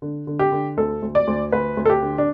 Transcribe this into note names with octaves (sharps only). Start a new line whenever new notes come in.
D3
D3
G4
D3
D2 A4
D2
D5
D2
D2 B4
D2
A4
G4
D3
D4